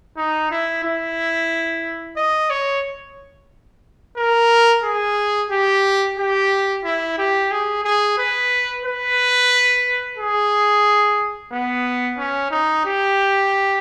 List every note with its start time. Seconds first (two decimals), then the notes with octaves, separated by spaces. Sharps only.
0.17 D#4
0.51 E4
0.84 E4
2.17 D#5
2.50 C#5
4.17 A#4
4.84 G#4
5.51 G4
6.18 G4
6.84 E4
7.18 G4
7.51 G#4
7.84 G#4
8.18 B4
8.85 B4
10.17 G#4
11.52 B3
12.18 C#4
12.51 D#4
12.85 G4